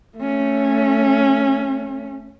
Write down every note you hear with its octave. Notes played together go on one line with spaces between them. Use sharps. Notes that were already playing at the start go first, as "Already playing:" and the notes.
A3 C#4